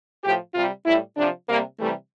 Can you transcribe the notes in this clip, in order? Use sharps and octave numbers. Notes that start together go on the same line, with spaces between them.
A2 F3 G4
C3 G3 F4
A2 G3 E4
C3 F3 D4
C3 G3 A#3
C3 E3 G3 A3